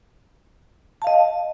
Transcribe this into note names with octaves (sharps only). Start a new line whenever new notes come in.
D#5 F5 A5